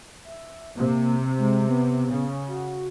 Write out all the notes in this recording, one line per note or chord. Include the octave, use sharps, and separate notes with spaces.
E5
C3 A#3
G#3
B3
C#3
F#4